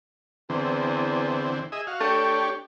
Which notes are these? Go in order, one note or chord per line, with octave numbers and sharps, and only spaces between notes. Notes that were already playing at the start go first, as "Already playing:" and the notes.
E2 D3 E3 C4
G#4 D#5 E5
F#4 F5
A3 D4 G4 C#5